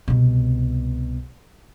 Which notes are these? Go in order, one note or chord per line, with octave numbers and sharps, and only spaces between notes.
C2 B2